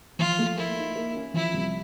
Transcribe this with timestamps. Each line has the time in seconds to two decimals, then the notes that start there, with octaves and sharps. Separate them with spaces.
0.19 F3 F4
0.39 A3
0.57 A#3 E4
0.78 D#4
0.96 A#3
1.15 C#4
1.34 F3 E4
1.54 C2